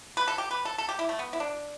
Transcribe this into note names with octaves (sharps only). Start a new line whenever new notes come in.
B4
A4
G4
B4
A4
A4
G4
E4
A3
B3
E4
D4